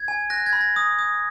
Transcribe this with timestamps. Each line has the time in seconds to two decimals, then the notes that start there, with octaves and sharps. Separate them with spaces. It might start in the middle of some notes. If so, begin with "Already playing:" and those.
Already playing: G#6
0.08 G#5
0.30 F#6 A#6
0.46 G#6
0.53 B5
0.61 A#6
0.76 D#6
0.99 D#6